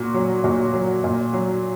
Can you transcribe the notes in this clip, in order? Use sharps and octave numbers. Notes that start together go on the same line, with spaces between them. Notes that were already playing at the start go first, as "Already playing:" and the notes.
Already playing: A#2 F#4
F#3
A#2 F#4
F#3
A#2
F#3